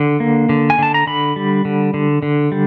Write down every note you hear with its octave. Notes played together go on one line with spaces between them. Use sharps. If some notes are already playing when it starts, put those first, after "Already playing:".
Already playing: D3
A#3
D3
G#5
D3 A5
A#5
D3 B5
G3
D3
D3
D3
G3